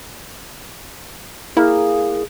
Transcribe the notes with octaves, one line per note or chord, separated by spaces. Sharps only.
A#3 E4 G#4